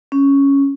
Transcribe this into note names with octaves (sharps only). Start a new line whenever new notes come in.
C#4